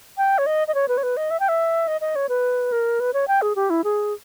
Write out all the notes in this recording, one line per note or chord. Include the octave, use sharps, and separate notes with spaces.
G5
C#5
D#5
D#5
C#5
B4
C#5
B4
D#5
E5
G5
E5
D#5
D#5
C#5
B4
A#4
B4
C#5
G5
G#4
G4
E4
G#4